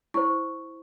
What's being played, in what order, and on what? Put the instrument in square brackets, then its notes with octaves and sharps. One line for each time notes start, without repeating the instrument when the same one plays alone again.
[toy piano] E4 C5 [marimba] C#6